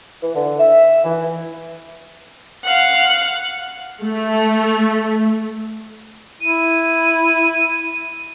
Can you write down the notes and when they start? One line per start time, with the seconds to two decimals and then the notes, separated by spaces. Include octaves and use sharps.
0.21 E3
0.34 D3
0.58 E5
1.04 E3
2.65 F5 F#5
4.03 A3
6.41 E4 D#7